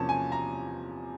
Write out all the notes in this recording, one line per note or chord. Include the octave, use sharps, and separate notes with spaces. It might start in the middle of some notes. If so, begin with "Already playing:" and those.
Already playing: E2 C3 F3 A#3 C#4 A5
G#5
A#5